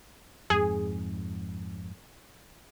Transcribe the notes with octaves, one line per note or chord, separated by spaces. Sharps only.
F2 G#2 G#4